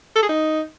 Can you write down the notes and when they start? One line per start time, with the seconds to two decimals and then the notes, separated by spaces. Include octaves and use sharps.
0.16 A4
0.23 G#4
0.29 D#4